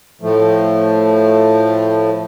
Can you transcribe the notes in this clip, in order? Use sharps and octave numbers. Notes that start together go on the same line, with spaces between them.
A2 F3 A3